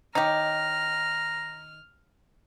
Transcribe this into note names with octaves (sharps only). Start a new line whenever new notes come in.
D#3 D#4 G4 C#5 D#5 A#5 F6